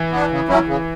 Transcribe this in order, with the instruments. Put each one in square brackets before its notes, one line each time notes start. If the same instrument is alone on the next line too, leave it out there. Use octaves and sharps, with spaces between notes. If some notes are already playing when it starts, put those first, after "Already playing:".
Already playing: [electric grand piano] E3
[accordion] B3 D4
C#3
F#3 C#4 E4
C#3